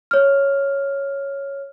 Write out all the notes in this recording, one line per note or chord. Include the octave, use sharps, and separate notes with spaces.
C#5 F6